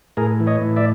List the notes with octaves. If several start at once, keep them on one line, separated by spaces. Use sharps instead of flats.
A2 G#4 A#4
E3
C#5 D#5
A2
D5 E5